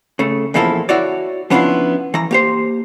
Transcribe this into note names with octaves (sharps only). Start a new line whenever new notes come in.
C#3 A3
E2 A#2 F3 E4 A4 A#4
E4 F#4 C#5 D5
F3 B3 C#4 D4 E4 F4
E3 A#5
A#3 G4 C5